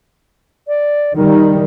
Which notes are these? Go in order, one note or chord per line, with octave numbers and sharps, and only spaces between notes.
D5
D#3 G3 D#4